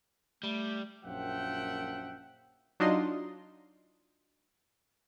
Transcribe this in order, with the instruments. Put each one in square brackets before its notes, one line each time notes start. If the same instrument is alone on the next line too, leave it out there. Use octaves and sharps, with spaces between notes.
[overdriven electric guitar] G3 [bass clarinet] A3
[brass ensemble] A#1 F#2 F3 E5 F#5 G5
[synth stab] F#3 D4 D#4 F4 D#5 C6